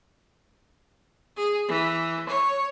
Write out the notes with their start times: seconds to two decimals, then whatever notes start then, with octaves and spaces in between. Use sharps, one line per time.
1.37 G#4
1.69 E3
2.29 C#5